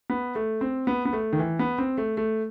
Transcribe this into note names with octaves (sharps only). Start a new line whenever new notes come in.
B3
A3
C4
B3
B3
A3
D#3
E3
B3
C4
A3
A3